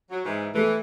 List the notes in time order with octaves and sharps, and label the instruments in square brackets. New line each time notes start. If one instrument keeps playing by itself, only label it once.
[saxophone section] F#3
G#2 E3
[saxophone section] E3 [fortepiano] A3 A4